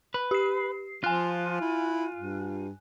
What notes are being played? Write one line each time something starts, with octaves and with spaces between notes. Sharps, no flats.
B4
G4 C7
F3 F4 G#5 F#6
E4
G2